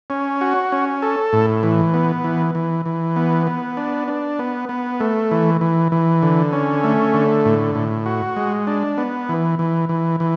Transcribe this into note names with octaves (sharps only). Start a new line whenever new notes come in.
C#4
F#4
C#4
A4
A2
E3
B3
E3
E3
E3
B3
B3
D4
D4
B3
B3
A3
E3
E3
E3
D3
C#4
A3
D3
A2
A2
F#4
G#3
D4
B3
E3
E3
E3
E3